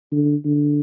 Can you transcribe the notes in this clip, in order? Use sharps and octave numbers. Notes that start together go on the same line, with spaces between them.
D3
D3